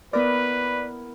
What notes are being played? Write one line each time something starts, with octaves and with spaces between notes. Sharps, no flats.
B3 E4 A#4 B4 D5